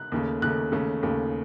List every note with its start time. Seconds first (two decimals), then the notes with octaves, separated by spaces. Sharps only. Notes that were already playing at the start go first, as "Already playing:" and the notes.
Already playing: F#6
0.12 D#2 C#3 A3
0.42 D#2 C#3 A3 F#6
0.72 D#2 C#3 A3
1.03 D#2 C#3 A3